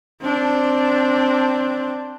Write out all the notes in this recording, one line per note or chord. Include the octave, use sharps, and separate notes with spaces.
C4 D4